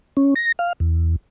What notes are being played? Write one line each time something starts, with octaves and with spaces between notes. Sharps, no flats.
C#4
A#6
F5
E2